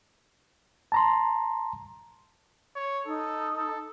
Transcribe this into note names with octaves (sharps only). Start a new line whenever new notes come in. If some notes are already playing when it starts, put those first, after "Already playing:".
A5 A#5 C6
C#5
D#4 A4
A4